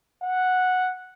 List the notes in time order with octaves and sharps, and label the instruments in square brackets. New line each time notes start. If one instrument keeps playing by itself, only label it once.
[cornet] F#5